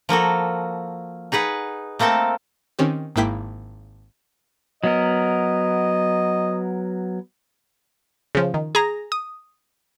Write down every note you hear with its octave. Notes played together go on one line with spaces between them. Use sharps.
F3 A#3 F#4 A4
D#4 G#4 B4 F#5
A3 A#3 C4 A4 A5
D#3 C4 C#4 G4
G#1 G#2 A#3 E4 G5 B6
F#3 B3 A#4 D#5
C#3 F3
D#3
G#4 A#5
D#6